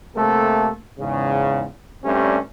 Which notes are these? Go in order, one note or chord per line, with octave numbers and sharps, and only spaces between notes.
C3 A3 A#3 G4 A4
E2 G#2 C#3
G2 G3 A3 C4 C#4